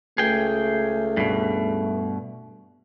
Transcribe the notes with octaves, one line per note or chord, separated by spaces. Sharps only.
C#2 A3 G#4 G5
G2 B2